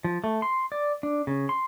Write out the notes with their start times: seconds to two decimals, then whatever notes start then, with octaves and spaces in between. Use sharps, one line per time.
0.04 F3
0.24 A3
0.42 C6
0.72 D5
1.03 D4
1.27 C#3
1.49 C6